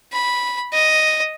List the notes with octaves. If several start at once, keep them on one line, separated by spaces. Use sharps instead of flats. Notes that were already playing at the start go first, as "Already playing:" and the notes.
B5
D#5